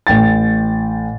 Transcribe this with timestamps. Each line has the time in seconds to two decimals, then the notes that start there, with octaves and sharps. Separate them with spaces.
0.07 A1 G5 A6